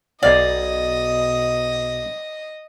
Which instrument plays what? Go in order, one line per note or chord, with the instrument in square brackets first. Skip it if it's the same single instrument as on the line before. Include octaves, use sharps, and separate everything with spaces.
[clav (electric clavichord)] B1 F5 [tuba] B2 [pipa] D5 [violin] D#5